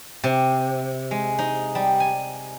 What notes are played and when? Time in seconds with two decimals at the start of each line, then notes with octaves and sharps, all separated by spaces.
0.24 C3
1.11 G#3
1.38 D#4
1.75 G3
2.00 G#5